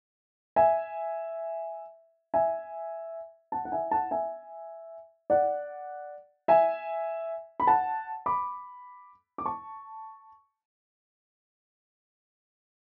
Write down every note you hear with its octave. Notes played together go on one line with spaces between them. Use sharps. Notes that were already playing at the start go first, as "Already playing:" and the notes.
E5 G#5
E5 G#5
F#5 A5
F#5
E5 G#5
F#5 A5
E5 G#5
D5 F#5
E5 G#5
B5
F#5 A5
B5 D6
D6
A5 C#6